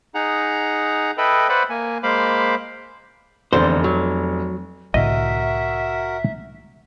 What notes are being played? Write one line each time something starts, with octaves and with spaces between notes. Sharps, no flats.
D#4 G#4 F#5 A#5
A4 B4 D#5 E5 G5 B5
B4 C5 D5 E5 F#5 B5
A#3 G#5
G#3 A#3 C5 F5 B5 D6
F1 E2 D3 C5
F#3
C2 A2 D3 F#4 A#4 D#5 E5